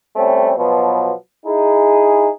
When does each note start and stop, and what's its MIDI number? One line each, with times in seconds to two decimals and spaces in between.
0.16 0.53 55
0.16 0.53 57
0.16 0.53 60
0.16 0.53 61
0.57 1.11 47
0.57 1.11 53
0.57 1.11 54
0.57 1.11 59
1.45 2.29 63
1.45 2.29 64
1.45 2.29 68